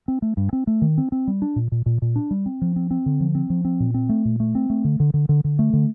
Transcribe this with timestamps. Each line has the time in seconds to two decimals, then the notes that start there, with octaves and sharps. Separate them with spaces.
0.08 C4
0.22 A3
0.37 G2
0.53 C4
0.67 A3
0.82 D#3
0.98 C4
1.12 C4
1.27 G3
1.42 D4
1.56 A#2
1.72 A#2
1.86 A#2
2.02 A#2
2.16 D4
2.31 G3
2.46 C4
2.61 F3
2.76 C4
2.91 C4
3.06 D3
3.20 F3
3.35 C4
3.50 F3
3.65 C4
3.80 A#2
3.94 C4
4.09 A3
4.25 A#2
4.40 A3
4.55 C4
4.70 A3
4.84 D3
5.00 D3
5.14 D3
5.29 D3
5.44 D3
5.59 A3
5.73 D3